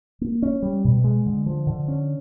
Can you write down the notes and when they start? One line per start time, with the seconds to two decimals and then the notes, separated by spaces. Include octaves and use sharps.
0.21 A#3
0.42 C#4
0.63 G3
0.84 B2
1.04 G#3
1.26 D3
1.46 F3
1.66 D3
1.88 C#4